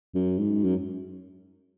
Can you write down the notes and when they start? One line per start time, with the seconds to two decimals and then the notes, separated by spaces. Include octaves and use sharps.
0.14 F#2
0.39 G#2
0.64 F#2